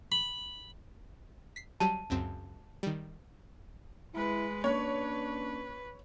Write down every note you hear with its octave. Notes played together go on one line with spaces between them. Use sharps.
B5
B6 C7
F#3 G3 A5
C#2 F#2 C4
D#3 G3
G#3 E4 B4
A#3 C#4 D4 B4 C#5